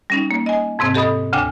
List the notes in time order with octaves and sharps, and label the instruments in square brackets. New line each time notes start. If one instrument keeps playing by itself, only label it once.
[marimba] G3 C#4 D#4
A#3
D#5 G#5
F2 G#2 C3 C4
G4 A4 D#5 B5 D#6
D2 C#3 D4 G5 G#5 D6